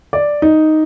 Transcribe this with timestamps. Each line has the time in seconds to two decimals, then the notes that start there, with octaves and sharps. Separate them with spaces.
0.13 D5
0.42 D#4